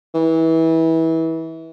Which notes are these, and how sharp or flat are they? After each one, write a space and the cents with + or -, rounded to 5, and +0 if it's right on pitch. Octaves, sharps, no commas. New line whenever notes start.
E3 -25